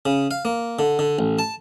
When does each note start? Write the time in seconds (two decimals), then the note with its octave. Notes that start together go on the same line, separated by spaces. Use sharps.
0.06 C#3
0.31 F5
0.45 A#3
0.79 D3
0.99 D3
1.19 A1
1.39 A5